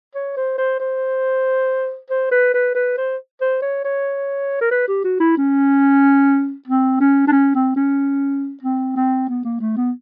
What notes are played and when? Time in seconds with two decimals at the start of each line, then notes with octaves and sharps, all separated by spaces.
0.15 C#5
0.37 C5
0.58 C5
0.80 C5
2.10 C5
2.32 B4
2.54 B4
2.75 B4
2.98 C5
3.41 C5
3.62 C#5
3.85 C#5
4.61 A#4
4.71 B4
4.88 G4
5.04 F#4
5.20 E4
5.37 C#4
6.68 C4
7.00 C#4
7.27 D4
7.32 C#4
7.55 C4
7.76 C#4
8.63 C4
8.96 C4
9.29 B3
9.45 A#3
9.61 A3
9.77 B3